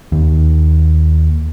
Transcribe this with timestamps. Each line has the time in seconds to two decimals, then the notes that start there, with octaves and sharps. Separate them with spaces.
0.12 D#2